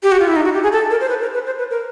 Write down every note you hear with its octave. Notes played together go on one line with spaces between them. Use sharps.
G4
F#4
F4
E4
D#4
F#4
G4
G#4
A4
A#4
C5
B4
A#4
B4
C5
B4
A#4